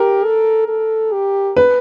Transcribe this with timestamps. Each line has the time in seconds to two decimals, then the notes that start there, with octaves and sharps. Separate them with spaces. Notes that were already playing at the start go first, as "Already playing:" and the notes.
Already playing: G4 A#4
0.25 A4
0.68 A4
1.13 G4
1.57 B4